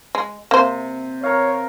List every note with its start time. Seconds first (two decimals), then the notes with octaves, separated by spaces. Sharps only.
0.15 G#3
0.51 C3 A#3 C5
1.24 A#4 C#5 F5